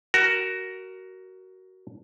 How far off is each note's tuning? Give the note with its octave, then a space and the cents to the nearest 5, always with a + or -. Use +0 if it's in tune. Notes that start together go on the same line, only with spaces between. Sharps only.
F#4 +15 A#4 +0